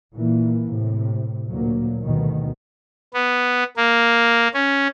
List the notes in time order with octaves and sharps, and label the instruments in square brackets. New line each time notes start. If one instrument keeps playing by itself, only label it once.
[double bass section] A#2 E3 A#3
A2 C3
D2 A#2 F#3 A#3
D2 G2 B2 D#3
[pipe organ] B3
A#3
C#4